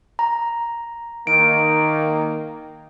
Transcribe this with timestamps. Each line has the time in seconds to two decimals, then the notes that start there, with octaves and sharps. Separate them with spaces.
0.19 A#5
1.27 D#3 A#3 D7